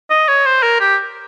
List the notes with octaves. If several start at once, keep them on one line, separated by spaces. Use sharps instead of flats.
D#5
C#5
C5
A#4
G4